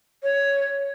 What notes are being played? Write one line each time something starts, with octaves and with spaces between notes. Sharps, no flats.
C#5